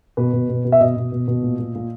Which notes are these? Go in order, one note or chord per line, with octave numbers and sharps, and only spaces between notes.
B2 B4
B2
B2
B2
E5
B2 D#5
B2
B2
B2
A#2
A#2
A#2